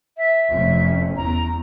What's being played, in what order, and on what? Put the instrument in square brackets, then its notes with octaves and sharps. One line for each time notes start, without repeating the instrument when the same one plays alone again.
[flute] E5
[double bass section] F1 F2 C#4
[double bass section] E2 [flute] A#5